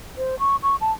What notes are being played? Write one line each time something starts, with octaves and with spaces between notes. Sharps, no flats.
C5
C#6
C#6
A5